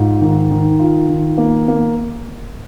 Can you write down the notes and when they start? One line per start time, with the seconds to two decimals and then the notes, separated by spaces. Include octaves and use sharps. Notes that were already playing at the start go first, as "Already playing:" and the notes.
Already playing: G#2 F4
0.21 D#3
0.51 D#3
0.79 F4
1.09 D#3
1.38 A#3
1.68 A#3